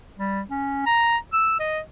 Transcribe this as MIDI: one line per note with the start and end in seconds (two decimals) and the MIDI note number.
0.18 0.42 55
0.50 0.85 61
0.86 1.17 82
1.33 1.55 88
1.60 1.80 75